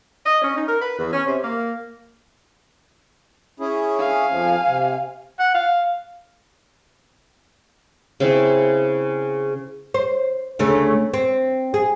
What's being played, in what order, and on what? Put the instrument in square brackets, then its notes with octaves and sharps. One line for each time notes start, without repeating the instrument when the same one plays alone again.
[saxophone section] D#5
C#4
D#4
A#4
B4
E2
C#4
C3
A#3
[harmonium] C#4 E4 G#4
[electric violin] F5 G#5
[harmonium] F2 F3
C3
[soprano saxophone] F#5
F5
[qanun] C#3 C4 C#4 E4
[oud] C5
D2 C#3 A3
C4
G#4